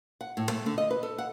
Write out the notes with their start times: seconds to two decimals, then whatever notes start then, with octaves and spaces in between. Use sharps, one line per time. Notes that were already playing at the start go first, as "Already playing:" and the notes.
0.21 F#5
0.37 A2
0.50 A3
0.66 D3
0.78 D#5
0.91 B4
1.03 A4
1.18 F#5